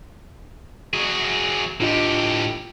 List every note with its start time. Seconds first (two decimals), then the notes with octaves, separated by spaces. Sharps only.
0.94 F#3 G#4
1.80 A2 D4 F4 G4 D#5